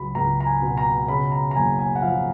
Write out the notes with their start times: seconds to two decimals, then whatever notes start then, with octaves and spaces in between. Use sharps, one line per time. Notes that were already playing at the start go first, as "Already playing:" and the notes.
Already playing: C#2 F#3 B5
0.15 C#2 A#5
0.40 A#5
0.46 G#5
0.62 B2
0.77 A#5
1.08 C#3 B5
1.32 A#5
1.51 A#5
1.56 F#1 G#5
1.79 G#5
1.96 F#5
2.02 F3 F5